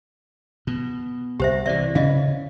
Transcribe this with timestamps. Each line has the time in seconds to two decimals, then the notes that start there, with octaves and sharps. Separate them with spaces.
0.67 B2
1.40 C2 G4 C5 E5
1.66 C3 E3 D5 E5
1.95 C#3 C#4 D#5 F5